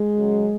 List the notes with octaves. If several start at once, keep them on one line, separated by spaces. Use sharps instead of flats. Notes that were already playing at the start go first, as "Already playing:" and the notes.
Already playing: G#3
F#2 C#3 F#3